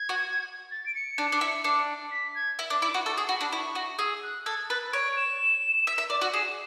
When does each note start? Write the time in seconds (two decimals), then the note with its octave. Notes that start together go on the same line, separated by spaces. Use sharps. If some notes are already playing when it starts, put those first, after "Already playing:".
Already playing: G#6
0.09 F#4
0.71 A6
0.86 D7
0.95 C#7
1.18 D4
1.32 D4
1.41 E4
1.64 D4
2.11 B6
2.35 G#6
2.59 E4
2.70 D4
2.82 E4 D6
2.94 F#4
3.06 A4 C#6
3.17 G#4
3.29 F#4 B5
3.41 D4
3.52 E4 C#6
3.75 F#4
3.99 G#4 E6
4.23 F#6
4.45 A4 G#6
4.70 B4 A6
4.92 C#5 D7
5.17 E7
5.87 E5
5.98 E5
6.10 D5
6.21 F#4
6.33 G#4 E7